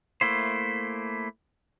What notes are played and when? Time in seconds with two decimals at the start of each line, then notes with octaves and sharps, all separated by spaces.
0.21 A3 A#3 E4 C5